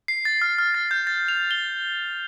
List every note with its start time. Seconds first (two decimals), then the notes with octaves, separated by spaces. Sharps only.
0.08 C7
0.25 A6
0.42 F6
0.58 F6
0.74 A6
0.91 G6
1.07 A6
1.28 F7
1.51 G7